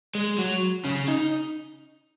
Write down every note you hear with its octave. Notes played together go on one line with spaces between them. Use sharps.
G#3
F#3
C#3
D#4